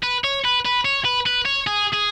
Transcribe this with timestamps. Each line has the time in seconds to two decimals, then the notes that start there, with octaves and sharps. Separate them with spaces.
0.03 B4
0.24 C#5
0.44 B4
0.65 B4
0.85 C#5
1.05 B4
1.26 B4
1.45 C#5
1.67 G#4
1.93 G#4